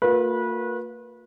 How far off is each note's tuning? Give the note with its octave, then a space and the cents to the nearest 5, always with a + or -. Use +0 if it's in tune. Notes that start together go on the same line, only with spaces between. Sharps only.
A#3 -35 F4 +40 B4 -25